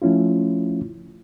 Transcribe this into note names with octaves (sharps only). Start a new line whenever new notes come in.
F3 A3 C#4 E4 F4